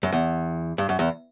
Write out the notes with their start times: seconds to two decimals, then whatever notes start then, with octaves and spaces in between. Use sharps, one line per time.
0.03 F#2
0.12 E2
0.78 G2
0.89 F#2
0.99 E2